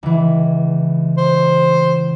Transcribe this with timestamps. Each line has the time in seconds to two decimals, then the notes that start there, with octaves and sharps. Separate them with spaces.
0.03 C#2 E3
1.18 C5